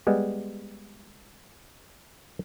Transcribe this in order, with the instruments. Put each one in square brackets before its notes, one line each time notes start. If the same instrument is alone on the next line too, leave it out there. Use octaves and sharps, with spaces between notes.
[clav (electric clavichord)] G3 G#3 B3